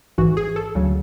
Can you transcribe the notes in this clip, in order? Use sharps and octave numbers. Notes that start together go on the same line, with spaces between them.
A1 G#2 E3 F#4
G#4
A4
D2 C#3 F#3